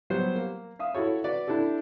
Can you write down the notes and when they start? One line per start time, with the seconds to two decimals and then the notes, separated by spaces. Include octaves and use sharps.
0.10 F#3 G3 B3 C5
0.36 A#3
0.79 E5 F5 D#6
0.95 E4 F#4 A4 C#5
1.24 F#4 B4 D5
1.48 D4 E4 G4 A4